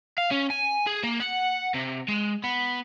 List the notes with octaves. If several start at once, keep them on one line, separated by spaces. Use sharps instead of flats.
F5
C#4
G#5
G#4
A#3
F#5
C3
G#3
B3